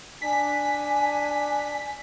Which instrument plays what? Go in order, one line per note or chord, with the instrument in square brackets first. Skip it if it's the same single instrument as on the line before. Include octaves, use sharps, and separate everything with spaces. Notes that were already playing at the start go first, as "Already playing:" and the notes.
[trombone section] D4 [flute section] G#5 [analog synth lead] B6